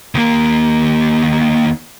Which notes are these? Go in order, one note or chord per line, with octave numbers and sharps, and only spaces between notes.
D#2 A#3